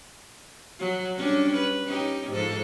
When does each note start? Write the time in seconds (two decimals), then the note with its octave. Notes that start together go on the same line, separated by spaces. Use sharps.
0.79 F#3
1.17 G3 C#4 D4
1.56 B4
1.86 C#4 D#4 G4
2.30 G#2 F3 A4